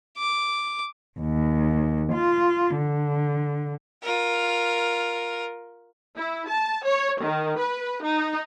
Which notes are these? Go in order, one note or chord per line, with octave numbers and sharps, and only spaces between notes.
D6
D#2
F4
D3
F4 A#4
E4
A5
C#5
D#3
B4
D#4